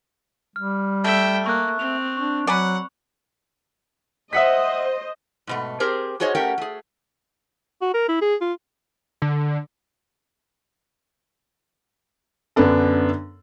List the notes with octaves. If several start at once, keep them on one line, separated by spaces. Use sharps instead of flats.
G3 F6
A3 E5 G5
A#3 C#6 F#6
C4 F7
D4 C#6
F#3 D5 F#5 G#5 B5
C5 D#5 E5 F#5 B6
G#2 B2 A3
C4 G4 G#4 A#4 C5
D#4 F#4 G#4 C5 C#5 D#5
A3 C#4 G4 A#4 F#5 G5
A3 G#4
F#4
A#4
E4
G#4
F4
D3
F#2 D3 B3 D4 A4